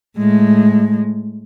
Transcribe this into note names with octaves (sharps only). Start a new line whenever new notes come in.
A2 G#3